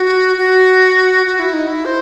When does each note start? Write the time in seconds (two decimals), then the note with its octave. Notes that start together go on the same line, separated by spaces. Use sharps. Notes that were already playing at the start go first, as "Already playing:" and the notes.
Already playing: F#4
0.37 F#4
1.26 F#4
1.39 E4
1.53 D#4
1.67 E4
1.85 C5